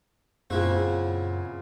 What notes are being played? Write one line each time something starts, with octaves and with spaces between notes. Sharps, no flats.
F#2 A#2 C#3 C4 E4 F#4